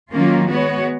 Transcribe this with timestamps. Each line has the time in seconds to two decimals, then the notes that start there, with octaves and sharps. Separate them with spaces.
0.11 D#3 F#3 A#3 C#4 F4
0.50 G#3 B3 F#4 C#5